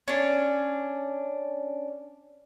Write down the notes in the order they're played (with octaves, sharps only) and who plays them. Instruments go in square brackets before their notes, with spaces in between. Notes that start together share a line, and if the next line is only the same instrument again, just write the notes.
[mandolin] C#4 D4